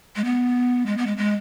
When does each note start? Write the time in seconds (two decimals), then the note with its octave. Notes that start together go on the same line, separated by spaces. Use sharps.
0.16 G#3
0.25 B3
0.86 G#3
0.97 B3
1.06 G#3
1.17 G#3